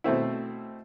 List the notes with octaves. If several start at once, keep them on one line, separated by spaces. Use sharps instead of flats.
B2 A3 C4 E4